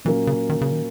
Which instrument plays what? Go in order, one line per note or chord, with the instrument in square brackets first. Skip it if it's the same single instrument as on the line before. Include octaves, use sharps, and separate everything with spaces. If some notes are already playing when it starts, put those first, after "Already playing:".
[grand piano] A#2 F#3 A#3 C#4 [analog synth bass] E3
[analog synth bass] C#3
D#3
C#3
D#3